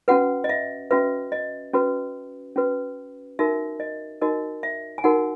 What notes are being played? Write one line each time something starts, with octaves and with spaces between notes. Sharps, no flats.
C#4 F#4 B4 F#5
D#5
E5
C#4 F#4 B4 E5
D#5
C#4 F#4 B4
C#4 F#4 B4
D#4 F#4 A#4 E5
D#5
D#4 F#4 A#4 D#5
E5
G#5
D#4 F#4 A#4 F#5